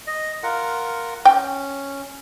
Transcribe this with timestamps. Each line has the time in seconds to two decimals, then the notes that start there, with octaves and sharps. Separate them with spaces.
0.07 D#5
0.43 F4 A#4 F#5
1.25 C#4 G5